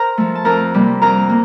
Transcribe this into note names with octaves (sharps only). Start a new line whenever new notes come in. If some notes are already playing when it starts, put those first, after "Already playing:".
Already playing: A#4 C5 A#5
F3 A3
A5
F2 A#4 A#5
C3 G3 A#3
F2 A#4 A#5
A#3